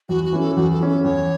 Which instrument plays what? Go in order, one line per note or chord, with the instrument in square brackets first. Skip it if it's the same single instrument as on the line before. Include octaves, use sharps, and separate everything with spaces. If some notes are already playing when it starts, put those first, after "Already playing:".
[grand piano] E2 [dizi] F#4
[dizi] F#4
[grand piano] E3 C#4
[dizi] A4
[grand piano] E2 [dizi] F#4
[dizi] A4
[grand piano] E3 C#4
[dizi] A4
[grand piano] E2 [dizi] C#5